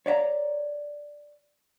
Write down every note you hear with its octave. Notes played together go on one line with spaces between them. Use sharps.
C#5 D5 E5 A#5